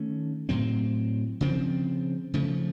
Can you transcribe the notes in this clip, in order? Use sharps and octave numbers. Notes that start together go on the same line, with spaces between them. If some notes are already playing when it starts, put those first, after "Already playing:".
Already playing: D#3 A3 C#4
A2 F#3 C4
C#3 F3 C4
C#3 F3 A3